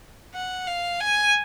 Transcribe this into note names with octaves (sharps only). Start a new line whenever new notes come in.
F#5
F5
G#5